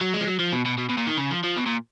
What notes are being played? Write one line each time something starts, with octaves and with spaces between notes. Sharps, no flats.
F#3
G#3
F3
F#3
F3
B2
B2
B2
B2
A#2
D#3
C#3
F3
F3
B2
A#2